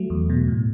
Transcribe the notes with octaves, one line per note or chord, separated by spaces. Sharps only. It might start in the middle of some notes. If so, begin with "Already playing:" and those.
Already playing: F#3 A3
E2
B2
A2